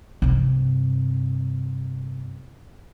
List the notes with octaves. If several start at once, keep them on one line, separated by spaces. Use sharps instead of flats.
G2 C3